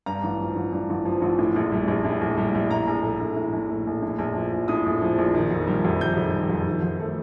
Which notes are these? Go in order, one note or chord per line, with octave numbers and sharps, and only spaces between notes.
G2 A#5
A1
F3
A1
G2
A1
F3
A1
A2
A#1
G3
A#1
A2
A#1
G3
A#1
A2 A#5
A#1
A3
A#1
A2
A#1
A3
A#1
A2
A#1
F3
A#1
A2 D#6
A#1
F3
A#1
D#3
F2
G3
F2
D#3 G6
F2
G3
F2
D#3
F2
A3